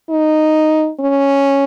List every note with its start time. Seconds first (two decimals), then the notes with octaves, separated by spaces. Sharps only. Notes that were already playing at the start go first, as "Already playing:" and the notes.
0.10 D#4
1.00 C#4